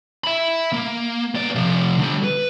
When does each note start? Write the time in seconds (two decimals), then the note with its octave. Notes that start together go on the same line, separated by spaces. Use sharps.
0.24 E5 B5
0.72 A#3
1.35 B3 D5
1.55 C3 F3
1.98 D3 G3
2.24 B4